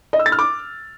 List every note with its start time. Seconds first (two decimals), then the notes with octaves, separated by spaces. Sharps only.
0.13 D#5
0.19 E6
0.26 A6
0.32 F6
0.39 D6